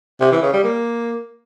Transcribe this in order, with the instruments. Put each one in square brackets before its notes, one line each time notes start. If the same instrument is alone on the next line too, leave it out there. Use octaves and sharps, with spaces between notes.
[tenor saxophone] C3
E3
C#3
G3
A#3